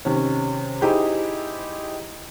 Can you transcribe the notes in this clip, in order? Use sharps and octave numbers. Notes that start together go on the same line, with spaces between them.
C3 D#3 C#4
D#4 E4 G4 G#4 C5